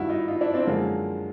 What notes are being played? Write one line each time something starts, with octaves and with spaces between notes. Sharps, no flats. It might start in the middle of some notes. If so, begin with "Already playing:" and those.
Already playing: G2 D#3 G3 E4 F#4
D#4 F4
D#4 F4
D4 E4
C4 D4
F#2 D3 F3 G#3 A#3